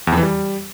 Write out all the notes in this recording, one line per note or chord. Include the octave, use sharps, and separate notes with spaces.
E2
F2
E3
G3